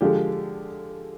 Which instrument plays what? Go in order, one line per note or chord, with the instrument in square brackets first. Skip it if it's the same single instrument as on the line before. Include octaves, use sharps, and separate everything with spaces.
[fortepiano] D3 F3 G#3 G4